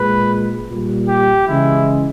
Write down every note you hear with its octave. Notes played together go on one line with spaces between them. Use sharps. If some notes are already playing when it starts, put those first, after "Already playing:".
Already playing: A#2 G#3 B4
A#2 G3
G4
C#3 E3 G#3 E4